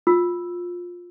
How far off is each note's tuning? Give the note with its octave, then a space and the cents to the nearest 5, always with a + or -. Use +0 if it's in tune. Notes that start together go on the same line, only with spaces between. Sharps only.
F4 +15 E6 +0